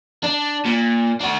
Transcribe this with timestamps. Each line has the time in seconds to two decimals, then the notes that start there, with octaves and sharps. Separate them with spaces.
0.23 D4
0.65 A#2
1.20 D4 F#4